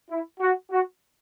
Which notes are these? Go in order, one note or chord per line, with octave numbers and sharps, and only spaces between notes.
E4
F#4
F#4